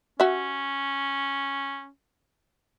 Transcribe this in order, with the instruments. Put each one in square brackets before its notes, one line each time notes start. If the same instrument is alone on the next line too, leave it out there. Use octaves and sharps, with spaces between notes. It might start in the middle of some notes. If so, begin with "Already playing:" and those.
[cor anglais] C#4 [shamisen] F#4 E5